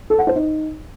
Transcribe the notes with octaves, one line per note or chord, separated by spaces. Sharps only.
A4
F#5
C5
D#4